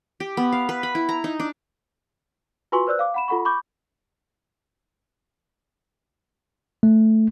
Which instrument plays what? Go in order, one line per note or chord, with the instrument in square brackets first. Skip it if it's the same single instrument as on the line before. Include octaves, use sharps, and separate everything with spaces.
[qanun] G4
B3
F5
B4
B5
E4
A#5
D#4
D4
[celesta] F4 F#4 B4 G#5 C6 C#6
B4 C5 D5 E6 F#6
F5 D6
F#5 B5 E7
F4 A4 F#5 B5 C#6
B5 C#6 D6 G6
[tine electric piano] A3